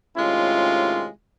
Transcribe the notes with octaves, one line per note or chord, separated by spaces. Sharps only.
A2 C3 D#3 G#3 C#4 F4